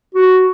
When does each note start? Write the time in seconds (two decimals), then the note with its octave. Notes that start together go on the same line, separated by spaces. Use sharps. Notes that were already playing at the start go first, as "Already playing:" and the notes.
0.15 F#4